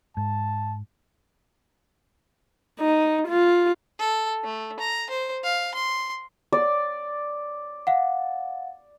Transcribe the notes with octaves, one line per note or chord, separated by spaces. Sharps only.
G#2 A5
D#4
F4
A4
A3
A#5
C5
F5
C6
D5
F5 F#5